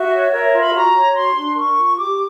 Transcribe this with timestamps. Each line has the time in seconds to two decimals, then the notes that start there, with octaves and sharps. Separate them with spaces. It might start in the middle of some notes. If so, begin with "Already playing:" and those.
Already playing: F#4 E5
0.12 C#5
0.33 A#4 E5
0.54 F4
0.62 B5
0.74 F#4 A#5
0.95 C#5
1.15 F#4 C6
1.36 D4
1.57 A#4 C#6
1.77 F4
1.98 G4 D6